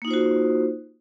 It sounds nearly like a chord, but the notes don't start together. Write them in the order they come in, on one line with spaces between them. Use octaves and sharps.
A#3 D#4 F4 C5 F#4